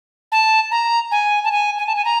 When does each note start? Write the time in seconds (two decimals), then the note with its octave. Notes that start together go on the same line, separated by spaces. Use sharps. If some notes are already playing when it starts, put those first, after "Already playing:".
0.32 A5
0.71 A#5
1.11 G#5
1.44 A5
1.52 G#5
1.78 G#5
1.87 A5
1.96 G#5
2.05 A#5